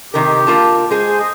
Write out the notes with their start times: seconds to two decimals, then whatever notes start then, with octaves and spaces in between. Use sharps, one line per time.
0.14 C3 D#3 G4 A#4
0.47 A#3 F4 A5
0.91 G#3 G#4 C5
1.20 D#5